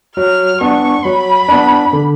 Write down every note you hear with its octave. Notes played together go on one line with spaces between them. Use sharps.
F#3 F6
B3 D4 C#6
F#3 B5
B3 D4
D3